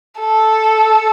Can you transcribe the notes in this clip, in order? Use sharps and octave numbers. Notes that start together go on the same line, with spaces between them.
A4